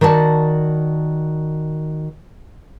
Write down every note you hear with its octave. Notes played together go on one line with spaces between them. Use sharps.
D#3 F#4 D5 A5